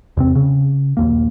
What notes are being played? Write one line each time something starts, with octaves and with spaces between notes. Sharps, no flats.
E2 C3 C4
C#3
A#1 D#2 A#3